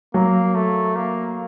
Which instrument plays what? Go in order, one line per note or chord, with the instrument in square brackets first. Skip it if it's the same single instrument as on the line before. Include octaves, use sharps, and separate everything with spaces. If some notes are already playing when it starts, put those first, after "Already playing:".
[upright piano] F#3 [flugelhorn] A#3
[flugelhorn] A3
A#3